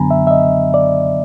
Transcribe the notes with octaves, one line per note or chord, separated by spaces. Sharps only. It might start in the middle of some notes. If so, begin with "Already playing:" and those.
Already playing: F#2 D3 F#3 B3 D4 G#5 A#5 B5
E5
E5
D#5
D5